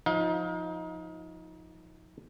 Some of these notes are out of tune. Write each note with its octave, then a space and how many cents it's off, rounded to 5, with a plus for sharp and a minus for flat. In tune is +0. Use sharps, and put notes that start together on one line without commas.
F3 +15 D#4 +25 F5 +35